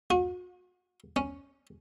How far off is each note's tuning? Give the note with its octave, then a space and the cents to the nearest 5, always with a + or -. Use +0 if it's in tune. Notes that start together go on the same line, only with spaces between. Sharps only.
F#4 -40
C#4 +0